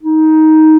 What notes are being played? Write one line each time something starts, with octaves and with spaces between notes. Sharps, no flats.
D#4